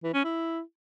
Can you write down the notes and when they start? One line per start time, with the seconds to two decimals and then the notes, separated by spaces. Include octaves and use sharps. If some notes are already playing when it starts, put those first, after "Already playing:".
0.04 E3
0.14 C#4
0.24 E4